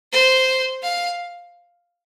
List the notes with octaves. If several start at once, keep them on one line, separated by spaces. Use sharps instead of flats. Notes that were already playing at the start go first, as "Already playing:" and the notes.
C5
F5